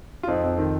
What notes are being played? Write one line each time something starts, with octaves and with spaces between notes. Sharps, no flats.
F4
F2 C4 D#4
F2
D#3